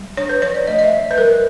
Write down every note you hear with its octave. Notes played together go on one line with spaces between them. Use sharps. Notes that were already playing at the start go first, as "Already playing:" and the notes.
Already playing: G3
D4 C#5
B4
F3 C#5
D5
A3 D#5
D#5
E5
F3
B4
G3 A#4